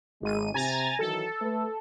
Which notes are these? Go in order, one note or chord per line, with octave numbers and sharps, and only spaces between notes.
G#1 G#3 D#7
C3 G#5 A#5 A6
D#3 E3 F#3 A4
A3 B4